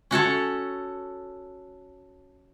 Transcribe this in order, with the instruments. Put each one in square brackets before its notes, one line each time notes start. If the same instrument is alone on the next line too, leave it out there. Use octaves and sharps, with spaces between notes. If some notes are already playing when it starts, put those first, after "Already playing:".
[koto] C#4 F#4 A4 C#5